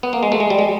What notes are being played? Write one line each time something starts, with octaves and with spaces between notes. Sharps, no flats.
B3
A#3
G#3
A3
G#3
G3
G#3